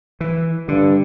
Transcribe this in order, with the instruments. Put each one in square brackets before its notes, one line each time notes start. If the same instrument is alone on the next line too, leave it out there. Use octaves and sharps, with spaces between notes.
[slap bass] E3
[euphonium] G2 [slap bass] D3